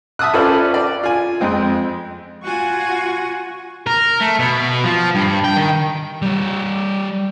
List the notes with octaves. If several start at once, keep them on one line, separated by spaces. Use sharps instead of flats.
E5 A5 D#6 E6 F#6
C#4 F4 A4 B4 C5 D5
D5
F4 G#5
F2 G#3 C4
F4 F#4 F#5 G#5 C#6
A#4
A3
B2
F3
G2
G5
D#3
G3 C#5